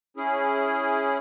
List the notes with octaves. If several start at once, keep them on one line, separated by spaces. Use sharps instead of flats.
C#4 E4 G#4